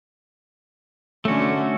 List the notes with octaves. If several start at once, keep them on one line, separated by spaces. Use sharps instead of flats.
D3 A3 C#4 F#4